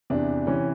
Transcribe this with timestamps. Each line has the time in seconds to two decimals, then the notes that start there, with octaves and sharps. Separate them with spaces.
0.10 E2 C3 E3 D4
0.47 C3 E3 C#4